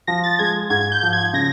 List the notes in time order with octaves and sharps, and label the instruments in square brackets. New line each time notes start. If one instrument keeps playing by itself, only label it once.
[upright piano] F3 [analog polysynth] A#6
[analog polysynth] A6
[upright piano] G#3 [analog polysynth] G#6
[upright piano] G#2 [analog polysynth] G#6
[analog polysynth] G6
[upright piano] F3
[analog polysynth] G#6
[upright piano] C#3 [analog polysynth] A#6